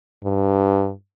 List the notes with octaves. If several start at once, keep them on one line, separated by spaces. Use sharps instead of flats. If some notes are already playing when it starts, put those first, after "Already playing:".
G2